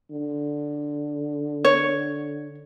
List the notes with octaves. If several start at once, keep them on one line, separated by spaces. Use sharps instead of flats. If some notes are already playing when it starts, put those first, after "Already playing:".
D3
C#5